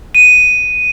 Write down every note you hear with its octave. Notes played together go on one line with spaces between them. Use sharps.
D#7